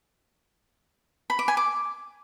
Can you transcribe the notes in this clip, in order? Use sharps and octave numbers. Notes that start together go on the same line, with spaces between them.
B5
D6
G#5
D6